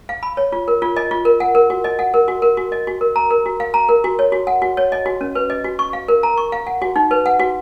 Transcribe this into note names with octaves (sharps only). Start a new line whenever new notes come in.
F5
B5
C#5
F4
A#4
F4
D#5
F4
A#4
F#5
A#4
F#4
D#5
F#5
A#4
F#4
A#4
F#4
D#5
F#4
A#4
A#5
A#4
F#4
F5
A#5
A#4
F#4
C#5
F#4
F#5
F#4
C#5
D#5
F#4
C#4
B4
D#5
F#4
C#6
F5
A#4
A#5
C#6
F5
F#5
F#4
D#4
B4
F#5
F#4